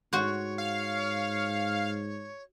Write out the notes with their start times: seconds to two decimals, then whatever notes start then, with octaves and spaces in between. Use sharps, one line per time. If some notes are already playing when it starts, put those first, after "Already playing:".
0.13 G#2 F#4 C5 C#5
0.58 F5